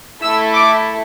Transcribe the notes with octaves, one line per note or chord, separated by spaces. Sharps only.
A3 E4 A4 E6
D6